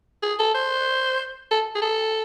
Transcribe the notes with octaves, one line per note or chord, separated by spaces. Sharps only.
G#4
A4
C5
A4
G#4
A4